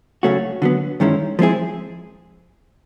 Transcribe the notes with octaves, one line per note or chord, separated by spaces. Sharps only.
C#3 F#3 A3 C#4 F#4
D3 F#3 B3
G2 D#3 G#3 C#4 E4
F3 G#3 C4 E4 G#4